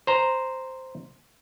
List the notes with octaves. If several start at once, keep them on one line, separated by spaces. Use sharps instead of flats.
C5 A#5